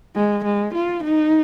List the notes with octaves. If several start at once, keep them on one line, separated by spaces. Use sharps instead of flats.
G#3
G#3
F4
D#4